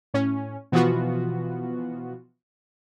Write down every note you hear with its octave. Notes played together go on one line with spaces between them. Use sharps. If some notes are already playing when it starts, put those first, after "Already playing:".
A2 C#4
B2 E3 F3 B3 F4 F#4